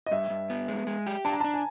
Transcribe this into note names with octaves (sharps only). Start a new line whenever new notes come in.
D#5
G2 E5
G2
B3
G#3
G#3
G4
D4 A5
A#5
A5
D4
G#5